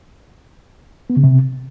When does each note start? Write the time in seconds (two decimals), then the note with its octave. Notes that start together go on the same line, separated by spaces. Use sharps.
1.10 B3
1.17 C#3
1.24 C3